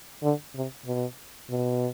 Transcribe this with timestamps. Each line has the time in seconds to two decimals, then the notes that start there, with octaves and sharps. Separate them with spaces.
0.23 D3
0.55 C3
0.86 B2
1.50 B2